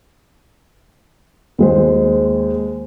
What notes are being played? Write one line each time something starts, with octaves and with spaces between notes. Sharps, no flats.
D#2 G#3 C5